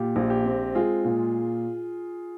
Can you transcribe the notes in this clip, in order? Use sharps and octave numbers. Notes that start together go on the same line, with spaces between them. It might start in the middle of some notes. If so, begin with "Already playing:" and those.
Already playing: A#2 G4
A#1
G4
C4
G#3 F4 G#4
A#2